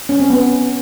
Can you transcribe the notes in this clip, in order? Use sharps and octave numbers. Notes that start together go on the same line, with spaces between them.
C#4
C4
B3